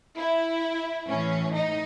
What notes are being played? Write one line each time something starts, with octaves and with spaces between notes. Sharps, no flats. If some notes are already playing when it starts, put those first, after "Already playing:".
E4
A2 E3 C#4
D#4